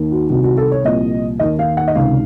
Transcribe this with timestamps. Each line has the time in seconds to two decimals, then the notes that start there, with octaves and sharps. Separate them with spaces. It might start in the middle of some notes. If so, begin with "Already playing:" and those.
Already playing: D#2 D#3
0.12 F#4
0.29 C2 C3 D#3 F#4
0.44 F#4
0.58 A4
0.71 C#5
0.84 C2 A#2 F3 D#5
1.39 D#2 D#3 D#5
1.59 F5
1.77 F#5
1.88 D#5
1.95 C#2 C3 D#3 F5